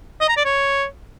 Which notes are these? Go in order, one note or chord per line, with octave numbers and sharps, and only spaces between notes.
D#5
A#5
D5
C#5